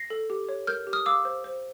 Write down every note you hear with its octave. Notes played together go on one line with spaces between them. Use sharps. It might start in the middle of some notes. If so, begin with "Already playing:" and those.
Already playing: A#6 C7
A4
G4
C#5
A#4 F6 G6
G4
D#6 F6
F5 D6 E6
C5
C5